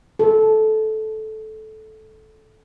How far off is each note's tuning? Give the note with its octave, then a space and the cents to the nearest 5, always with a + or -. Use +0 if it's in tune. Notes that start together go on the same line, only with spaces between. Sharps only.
A4 -15